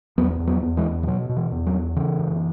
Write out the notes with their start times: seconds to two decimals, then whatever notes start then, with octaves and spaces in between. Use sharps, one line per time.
0.18 E2 F#3 B3
0.40 E2
0.47 F#3 B3
0.62 E2
0.77 E3 G#3
0.85 E2
1.03 E3
1.07 B2 F#3
1.29 B2
1.37 E3
1.52 E2
1.66 F#3
1.74 E2
1.96 C#3 E3
2.18 F#2